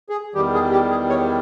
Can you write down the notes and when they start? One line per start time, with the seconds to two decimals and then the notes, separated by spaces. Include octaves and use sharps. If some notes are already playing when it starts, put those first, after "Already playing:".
0.09 G#4
0.35 E2 D#3 G3 G4
0.54 G#4
0.72 G4
0.90 G#4
1.09 C#5